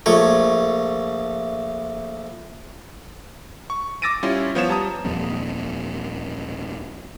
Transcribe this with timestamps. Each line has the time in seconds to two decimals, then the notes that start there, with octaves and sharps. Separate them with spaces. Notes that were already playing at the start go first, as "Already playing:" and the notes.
0.06 A#1 A3 C#5
3.70 C#6
4.02 D6 E6 A6 A#6 D7 D#7
4.23 G3 C#4 E4 F4
4.55 F3 B3 F4 C#5 E7
4.69 G3 A5 A#5 D#6
5.04 D#1 F2 A#2